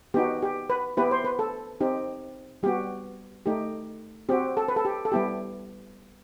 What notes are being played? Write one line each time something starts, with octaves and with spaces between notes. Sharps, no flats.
B3 D#4 F#4 G4
G4
B4
B3 E4 G4 B4
C5
B4
A4
C4 D#4 G4
G3 B3 F#4 G4
A3 D#4 G4
C4 F#4 G4
A4
B4
A4
G4
A4
G3 B3 E4 G4